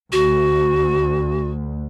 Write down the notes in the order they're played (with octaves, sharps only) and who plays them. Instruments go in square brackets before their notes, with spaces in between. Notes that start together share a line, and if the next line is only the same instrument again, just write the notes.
[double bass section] D2 [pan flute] F#4